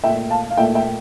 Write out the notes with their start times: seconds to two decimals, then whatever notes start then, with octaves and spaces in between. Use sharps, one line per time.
0.03 A#2 A3 E5 G5
0.30 F5 A5
0.50 F5
0.57 A#2 A3 E5 G5
0.75 E5 G5